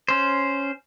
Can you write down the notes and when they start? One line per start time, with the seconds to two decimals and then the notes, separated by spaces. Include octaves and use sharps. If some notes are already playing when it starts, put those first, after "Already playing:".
0.08 C#4 C5